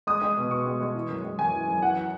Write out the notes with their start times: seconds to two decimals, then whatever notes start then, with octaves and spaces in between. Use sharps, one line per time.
0.07 G#3 D#6
0.22 G#3
0.37 B2
0.51 B2 C#6
0.66 G#3
0.81 G#3
0.95 E3
1.09 F#2
1.24 G#3
1.38 F#2 G#5
1.53 E3
1.68 F#2
1.82 E3 F#5